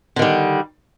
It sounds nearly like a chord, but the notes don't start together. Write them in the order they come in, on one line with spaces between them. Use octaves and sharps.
D3 D#3 G3